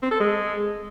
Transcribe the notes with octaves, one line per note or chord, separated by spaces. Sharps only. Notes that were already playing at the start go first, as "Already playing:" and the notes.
C4
A4
G#3